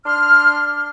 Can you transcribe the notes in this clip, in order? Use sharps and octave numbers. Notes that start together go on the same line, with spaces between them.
D4 C6 F6